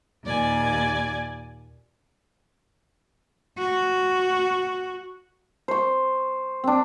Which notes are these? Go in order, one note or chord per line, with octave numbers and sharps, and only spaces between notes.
D#2 A#2 D5 G#5
F#4
C5 C#6
C4 D4